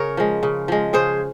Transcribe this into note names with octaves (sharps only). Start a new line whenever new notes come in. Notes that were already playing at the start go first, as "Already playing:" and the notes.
Already playing: C#3 A#4 C#5
F3 G#3
C#3
F3 G#3
C#3 G#4 C5